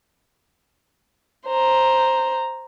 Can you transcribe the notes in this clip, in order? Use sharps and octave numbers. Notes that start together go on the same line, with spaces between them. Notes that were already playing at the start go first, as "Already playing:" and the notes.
C5 A#5